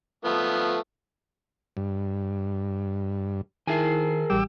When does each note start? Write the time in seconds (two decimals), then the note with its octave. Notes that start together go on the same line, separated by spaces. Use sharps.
0.25 F3 A3 B3
1.77 G2
3.67 D#3 E4 G#4 A#4 G#5 C7
4.30 A1 G3 G5 D6 E6